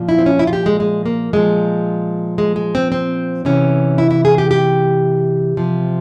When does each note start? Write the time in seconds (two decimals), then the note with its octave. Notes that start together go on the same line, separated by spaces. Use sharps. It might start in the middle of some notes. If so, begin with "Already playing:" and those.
Already playing: A#2 F3
0.09 E4
0.19 C4
0.26 C#4
0.39 E4
0.47 F4
0.53 G4
0.66 G#3
0.80 G#3
1.06 A#3
1.33 A#2 F3 G#3
2.38 G#3
2.56 G#3
2.75 C4
2.92 C4
3.45 C3 E3 C#4
3.98 E4
4.11 E4
4.25 G#4
4.38 G4
4.51 G4
5.57 C3 F3